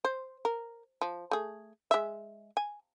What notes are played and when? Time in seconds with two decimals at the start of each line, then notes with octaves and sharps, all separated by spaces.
0.05 C5
0.45 A#4
1.01 F3
1.31 A3 G#4
1.91 G#3 E5
2.57 G#5